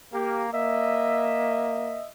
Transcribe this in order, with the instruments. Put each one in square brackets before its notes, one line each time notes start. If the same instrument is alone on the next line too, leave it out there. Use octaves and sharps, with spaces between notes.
[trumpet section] A#3 [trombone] G4
[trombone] A#3 [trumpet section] D#5 E5